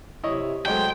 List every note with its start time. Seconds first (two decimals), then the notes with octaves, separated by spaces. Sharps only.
0.24 C3 E4 C#5 D#5
0.66 F#3 G#3 A3 C5 G5